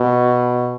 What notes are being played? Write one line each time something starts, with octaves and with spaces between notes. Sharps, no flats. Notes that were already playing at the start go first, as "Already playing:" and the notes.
Already playing: B2